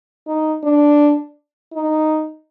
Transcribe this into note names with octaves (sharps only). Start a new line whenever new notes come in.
D#4
D4
D#4